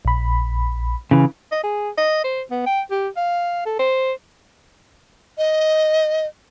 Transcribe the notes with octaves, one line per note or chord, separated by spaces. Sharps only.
A#1 B5
C#3 E3
D#5
G#4
D#5
C5
B3
G5
G4
F5
A4
C5
D#5